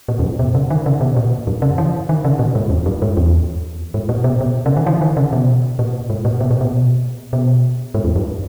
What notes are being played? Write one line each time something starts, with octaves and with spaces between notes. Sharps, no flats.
A#2
E2
F#2
B2
C#3
D#3
C#3
B2
A#2
F#2
C#3
E3
D#3
C#3
A#2
G#2
E2
F#2
G#2
E2
G#2
A#2
B2
B2
C#3
D#3
E3
D#3
C#3
B2
A#2
G#2
A#2
B2
A#2
B2
B2
G#2
E2
F#2